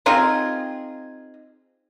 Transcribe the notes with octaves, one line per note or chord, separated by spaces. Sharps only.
C4 D#4 F4 G#4